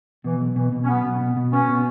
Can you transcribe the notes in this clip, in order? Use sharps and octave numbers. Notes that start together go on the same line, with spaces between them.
B2 E3
B1
B2 E3
B2
C#4
B1 B3
B1
B2
B2
B3 C#4
B2